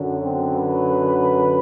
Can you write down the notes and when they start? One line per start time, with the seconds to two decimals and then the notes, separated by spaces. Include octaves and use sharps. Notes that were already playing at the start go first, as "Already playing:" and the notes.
Already playing: F#2 D3 F#3
0.22 C4
0.57 B4